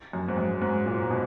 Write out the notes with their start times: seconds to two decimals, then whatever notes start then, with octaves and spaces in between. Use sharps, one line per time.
0.13 F#2
0.29 G#2
0.37 F#2
0.62 G#2
0.86 A#2
1.10 B2